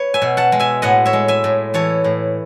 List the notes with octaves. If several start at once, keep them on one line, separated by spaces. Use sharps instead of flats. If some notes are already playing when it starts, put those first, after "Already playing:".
Already playing: B4 C#5
E5 G#5
B2
F#5 A5
G#3
E5 G#5
A2 D#5 F#5
C#5 E5
G#3
E5 G#5
A2
E3 A4 C#5
A2